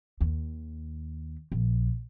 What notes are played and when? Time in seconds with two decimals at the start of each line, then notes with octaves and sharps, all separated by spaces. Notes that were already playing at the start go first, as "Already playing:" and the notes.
0.21 D#2
1.52 A#1